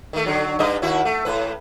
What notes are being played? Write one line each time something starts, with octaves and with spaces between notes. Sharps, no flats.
D#3 A3
D3 F#3
G2 D#4 D#5
D#2 E4 F#4
A3
A2 B4